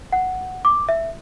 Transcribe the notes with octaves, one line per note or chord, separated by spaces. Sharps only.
F#5
D6
E5